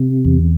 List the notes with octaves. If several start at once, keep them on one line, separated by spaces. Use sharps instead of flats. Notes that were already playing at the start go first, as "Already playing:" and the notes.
Already playing: C3
E2